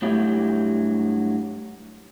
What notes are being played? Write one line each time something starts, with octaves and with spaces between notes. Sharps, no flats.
G2 F#3 A3 E4 G4 D#5